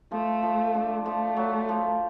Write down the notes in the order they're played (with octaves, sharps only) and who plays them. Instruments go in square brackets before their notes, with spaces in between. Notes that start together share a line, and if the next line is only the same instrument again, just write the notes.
[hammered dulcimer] F3 [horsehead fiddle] A3
[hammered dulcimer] F3
D3
[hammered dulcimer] F3 [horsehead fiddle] A3
[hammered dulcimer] F#3
F3